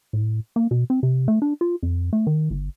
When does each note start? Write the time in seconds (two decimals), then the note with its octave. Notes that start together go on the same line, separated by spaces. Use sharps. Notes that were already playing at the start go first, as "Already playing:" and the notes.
0.13 A2
0.56 A#3
0.71 B2
0.90 C4
1.03 C3
1.28 A3
1.42 D4
1.61 F4
1.83 F2
2.13 A3
2.27 D#3
2.50 G1